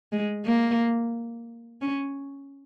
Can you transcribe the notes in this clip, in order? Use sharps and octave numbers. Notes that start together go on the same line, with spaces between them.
G#3
A#3
C#4